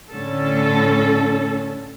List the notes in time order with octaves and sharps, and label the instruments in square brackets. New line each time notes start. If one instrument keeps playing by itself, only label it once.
[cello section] A2 D3 C#4 A4